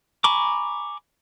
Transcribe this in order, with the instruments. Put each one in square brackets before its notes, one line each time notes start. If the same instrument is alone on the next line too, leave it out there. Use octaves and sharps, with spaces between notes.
[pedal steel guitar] G#5 A#5 B5 C#6 D6